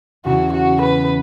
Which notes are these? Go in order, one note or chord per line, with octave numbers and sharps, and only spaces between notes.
E2 C#3 E3 C#4 E4 F#4
F#4
B4